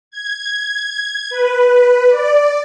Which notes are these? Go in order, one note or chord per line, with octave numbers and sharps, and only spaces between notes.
G#6
B4
D5